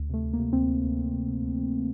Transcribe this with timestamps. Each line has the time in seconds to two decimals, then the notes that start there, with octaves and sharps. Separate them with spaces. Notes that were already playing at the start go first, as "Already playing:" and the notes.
Already playing: D2
0.09 C3 A3
0.24 D2
0.33 A#3
0.39 C3
0.53 D2 C4
0.68 D2
0.84 D2
0.97 D2
1.13 C3
1.27 C3
1.43 D2
1.58 F3